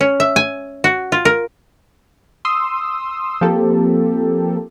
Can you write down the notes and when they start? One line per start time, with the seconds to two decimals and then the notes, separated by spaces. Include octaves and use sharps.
0.01 C#4
0.20 E5
0.36 G#5
0.84 F#4
1.12 F4
1.25 A#4
2.45 C6 D#6 E6
3.41 F3 A#3 C4 G4 A4